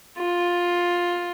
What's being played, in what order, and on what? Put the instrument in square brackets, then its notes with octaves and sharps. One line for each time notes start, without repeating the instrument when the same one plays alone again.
[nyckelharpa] F4